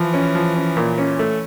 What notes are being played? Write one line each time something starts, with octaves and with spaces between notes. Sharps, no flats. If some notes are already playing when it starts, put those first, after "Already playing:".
Already playing: E3 F3
C#4
F3
C#4
A#2
C#4
A3